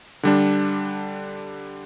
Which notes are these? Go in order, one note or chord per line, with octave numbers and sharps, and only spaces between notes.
D3 G3 D4